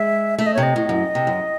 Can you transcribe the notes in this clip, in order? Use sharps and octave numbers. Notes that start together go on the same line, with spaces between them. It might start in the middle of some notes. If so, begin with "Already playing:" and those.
Already playing: G#3 E5
A3 E5
D#5
C#5
C3
D#5
A2
F#2
C3
F#2